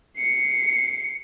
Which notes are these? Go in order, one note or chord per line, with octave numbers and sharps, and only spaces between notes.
C7 C#7